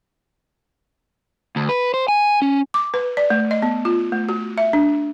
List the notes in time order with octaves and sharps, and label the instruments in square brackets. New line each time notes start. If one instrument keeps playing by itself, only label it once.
[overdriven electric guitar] D2
B4
C5
G#5
C#4
[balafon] D6
B4
D5
A3
D#5
B3
F4
A3
F#4
E5
D4